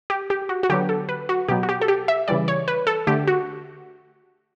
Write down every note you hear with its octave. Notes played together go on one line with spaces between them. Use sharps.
G4
G4
F#4
F#4
D3 F#3 B3 G4
A4
B4
F#4
B2 F#3 B3 G4
F#4
G4
A4
G4
E5
C#3 E3 G3 D5
C#5
B4
A4
D3 A3 G4
F#4